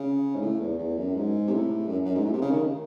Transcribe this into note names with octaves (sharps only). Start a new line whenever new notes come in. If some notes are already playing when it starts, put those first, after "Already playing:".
Already playing: C#3
G#2
A2
E2
E2
F#2
G#2
C3
A2
F#2
F#2
G#2
A2
C3
C#3
D#3